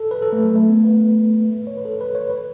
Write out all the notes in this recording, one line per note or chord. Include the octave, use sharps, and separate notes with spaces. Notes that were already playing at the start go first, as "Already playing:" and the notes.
Already playing: A4
B4
A4
A3
F#3
A3
B3
B4
C#5
B4
A4
B4
C#5
B4